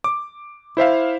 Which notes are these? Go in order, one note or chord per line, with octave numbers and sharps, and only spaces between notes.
D6
E4 C5 E5 F5